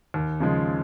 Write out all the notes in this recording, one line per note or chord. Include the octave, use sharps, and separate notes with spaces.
D#2
C#3 F3 G#3